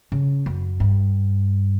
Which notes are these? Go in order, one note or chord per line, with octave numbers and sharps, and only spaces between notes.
C#3
F#2
G2